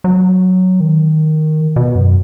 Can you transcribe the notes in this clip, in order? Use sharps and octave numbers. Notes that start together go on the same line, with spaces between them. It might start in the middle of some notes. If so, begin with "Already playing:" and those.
F#3
D#3
B2
F#2